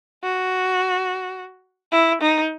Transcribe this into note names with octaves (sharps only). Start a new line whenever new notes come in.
F#4
E4
D#4